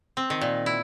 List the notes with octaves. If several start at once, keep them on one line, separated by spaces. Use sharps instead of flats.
C4
D#3
A#2
E4